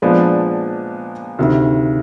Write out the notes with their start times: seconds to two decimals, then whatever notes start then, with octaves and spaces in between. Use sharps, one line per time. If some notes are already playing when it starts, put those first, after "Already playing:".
0.02 A#2 F3 G#3 B3 D4
1.39 D2 C3 D#3